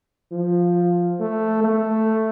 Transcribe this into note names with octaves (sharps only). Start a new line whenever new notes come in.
F3
A3
A3